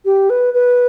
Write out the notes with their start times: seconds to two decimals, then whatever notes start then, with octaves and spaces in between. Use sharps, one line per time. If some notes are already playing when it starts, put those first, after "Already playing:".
0.05 G4
0.30 B4
0.54 B4